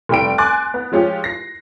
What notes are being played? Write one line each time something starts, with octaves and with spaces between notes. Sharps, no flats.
F1 G3 G5 D7
G#5 C6 D6 F#6 A6
B3
F3 G#3 C#4 F4 G4
A#6 C7